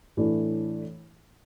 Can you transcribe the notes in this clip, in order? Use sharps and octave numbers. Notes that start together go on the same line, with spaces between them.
A2 E3 A3 D4